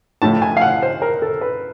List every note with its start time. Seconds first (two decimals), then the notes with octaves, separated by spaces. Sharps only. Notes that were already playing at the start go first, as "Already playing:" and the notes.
0.22 A2 F3 A3 A5
0.42 G#5
0.57 F5
0.61 F#5
0.83 C5
1.02 A#4
1.22 A4
1.41 B4